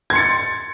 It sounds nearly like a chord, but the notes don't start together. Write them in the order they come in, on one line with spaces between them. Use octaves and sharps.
G#6 C6 C#7 A6